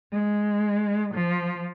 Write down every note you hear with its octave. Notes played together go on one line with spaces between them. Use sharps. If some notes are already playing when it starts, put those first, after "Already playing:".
G#3
F3